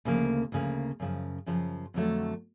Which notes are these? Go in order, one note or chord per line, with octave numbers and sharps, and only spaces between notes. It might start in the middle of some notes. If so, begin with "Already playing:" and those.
D2 C#3 F3 A#3
D2 C#3 F3 A#3
F#2 C#3 F3
F#2 C#3 F3
F2 D3 F#3 A3